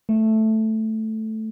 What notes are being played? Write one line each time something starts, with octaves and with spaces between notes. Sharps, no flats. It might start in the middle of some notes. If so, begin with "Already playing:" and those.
A3